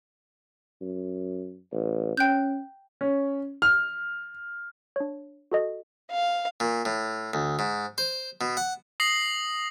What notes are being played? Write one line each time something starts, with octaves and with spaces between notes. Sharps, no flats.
F#2
A1
C#4 G5 F#6 G6
C#4
F6
D4 C#5
F#4 A4 D#5
F5
A#2
A2
D2
G#2
C5
B2
F#5
D#6 A#6 C7 F#7